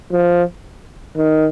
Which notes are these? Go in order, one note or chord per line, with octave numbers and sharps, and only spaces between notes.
F3
D#3